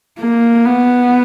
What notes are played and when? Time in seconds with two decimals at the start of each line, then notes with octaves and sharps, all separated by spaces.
0.19 A#3
0.65 B3